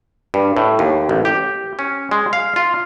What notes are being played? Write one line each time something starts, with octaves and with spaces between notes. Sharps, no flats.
G2
A2
D#2
A1
G4
C#4
G#3
F5
F4